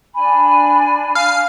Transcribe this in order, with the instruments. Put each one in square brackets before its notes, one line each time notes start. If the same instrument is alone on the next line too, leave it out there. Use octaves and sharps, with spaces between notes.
[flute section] D4 G#5 [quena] B5
[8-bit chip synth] F5